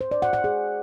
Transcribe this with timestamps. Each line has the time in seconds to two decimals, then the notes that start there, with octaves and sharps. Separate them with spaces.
0.01 C5
0.11 D5
0.22 F#5
0.33 F#5
0.44 G#4